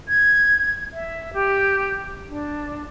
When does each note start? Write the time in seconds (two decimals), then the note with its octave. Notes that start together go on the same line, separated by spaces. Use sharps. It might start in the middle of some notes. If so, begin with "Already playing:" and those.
0.08 G#6
0.93 E5
1.34 G4
2.29 D4